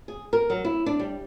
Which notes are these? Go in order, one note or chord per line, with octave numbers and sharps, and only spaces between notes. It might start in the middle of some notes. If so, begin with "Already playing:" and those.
G#4
A#4
F#3
E4
D4
G3